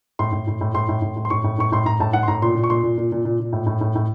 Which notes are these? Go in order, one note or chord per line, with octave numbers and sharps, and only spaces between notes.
A2 C6
A2
A2
A2
A2 C6
A2
A2
A2
C6
A2 C#6
A2
A2 C#6
A2 C6
A2 A#5
A2 A5
A2 F#5
C6
A2 A#5
A#2 C6
A#2
C#6
A#2 C6
A#2
A#2
A#2
A#2
A#2
A2
A2
A2
A2